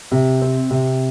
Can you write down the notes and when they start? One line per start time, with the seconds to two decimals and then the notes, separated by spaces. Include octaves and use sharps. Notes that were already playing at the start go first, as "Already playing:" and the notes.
0.11 C3
0.41 C4
0.70 C3